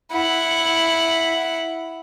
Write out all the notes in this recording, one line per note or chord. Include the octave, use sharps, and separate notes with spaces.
E4 F#5